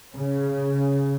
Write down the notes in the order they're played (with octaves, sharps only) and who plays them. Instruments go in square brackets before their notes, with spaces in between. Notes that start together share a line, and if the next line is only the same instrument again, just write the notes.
[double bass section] C#3